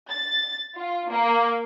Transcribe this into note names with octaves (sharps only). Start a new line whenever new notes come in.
A6
F4
A#3